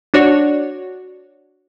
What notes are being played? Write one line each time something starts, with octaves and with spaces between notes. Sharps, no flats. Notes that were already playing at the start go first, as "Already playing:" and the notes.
D4 F#4 C#5 D5